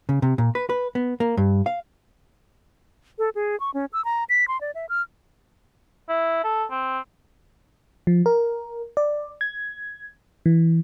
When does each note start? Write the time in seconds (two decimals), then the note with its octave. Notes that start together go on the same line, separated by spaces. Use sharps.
0.09 C#3
0.22 C3
0.38 A#2
0.55 B4
0.69 B4
0.95 B3
1.20 A#3
1.37 G2
1.66 F5
3.19 A4
3.35 G#4
3.60 C#6
3.74 C#4
3.93 E6
4.05 A#5
4.29 B6
4.48 C6
4.61 D5
4.75 E5
4.89 F6
6.09 E4
6.44 A4
6.71 C4
8.07 F3
8.26 A#4
8.97 D5
9.41 G#6
10.46 E3